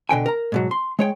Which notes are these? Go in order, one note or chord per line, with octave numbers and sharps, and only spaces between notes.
B2 D3 G5 G#5
A#4 A#5
G#2 B2 F#3
C6
G#3 C#5 G5